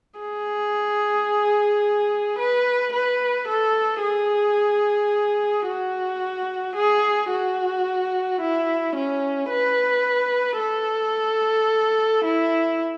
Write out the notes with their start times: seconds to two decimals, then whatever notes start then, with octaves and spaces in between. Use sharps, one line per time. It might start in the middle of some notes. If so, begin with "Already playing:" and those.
0.20 G#4
2.39 B4
2.93 B4
3.48 A4
4.02 G#4
5.67 F#4
6.76 G#4
7.31 F#4
8.41 E4
8.96 C#4
9.50 B4
10.59 A4
12.24 E4